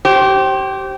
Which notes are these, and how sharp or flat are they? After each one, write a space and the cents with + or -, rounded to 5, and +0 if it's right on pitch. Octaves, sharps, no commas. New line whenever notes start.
G4 -25 C5 +30